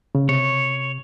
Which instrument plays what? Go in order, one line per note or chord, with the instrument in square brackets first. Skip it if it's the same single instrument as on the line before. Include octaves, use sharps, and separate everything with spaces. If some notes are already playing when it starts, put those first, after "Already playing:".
[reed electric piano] C#3
[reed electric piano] C3 [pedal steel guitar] C#5